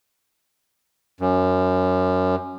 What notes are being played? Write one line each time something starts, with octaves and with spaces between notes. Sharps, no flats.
F#2